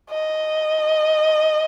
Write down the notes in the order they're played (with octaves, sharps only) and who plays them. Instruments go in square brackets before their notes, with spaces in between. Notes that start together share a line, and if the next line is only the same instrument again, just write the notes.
[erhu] D#5